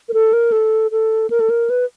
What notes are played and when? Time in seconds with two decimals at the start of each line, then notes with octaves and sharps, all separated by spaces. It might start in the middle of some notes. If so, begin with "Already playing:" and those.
0.09 A#4
0.14 A4
0.33 A#4
0.52 A4
0.92 A4
1.30 A#4
1.40 A4
1.50 A#4
1.70 B4